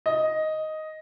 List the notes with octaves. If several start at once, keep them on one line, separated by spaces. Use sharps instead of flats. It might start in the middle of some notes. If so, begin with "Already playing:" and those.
D#5